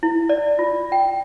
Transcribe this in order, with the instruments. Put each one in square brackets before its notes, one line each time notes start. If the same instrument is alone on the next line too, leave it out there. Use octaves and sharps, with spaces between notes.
[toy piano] E4
D5
F4
G5